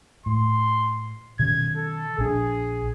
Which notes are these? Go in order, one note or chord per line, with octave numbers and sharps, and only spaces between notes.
A2 C6
B2 D#3 C#4 G#6
A4
A#1 D4 G#4